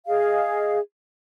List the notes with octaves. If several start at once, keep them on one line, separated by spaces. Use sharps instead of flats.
G#4 D#5 F5